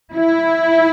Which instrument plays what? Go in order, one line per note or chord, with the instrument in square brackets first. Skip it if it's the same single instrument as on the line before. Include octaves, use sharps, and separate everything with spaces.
[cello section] E4